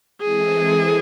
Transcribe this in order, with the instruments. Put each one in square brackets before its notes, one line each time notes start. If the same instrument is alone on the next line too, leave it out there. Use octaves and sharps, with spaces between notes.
[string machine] E3 G#3 C4 E4 A4 [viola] G#4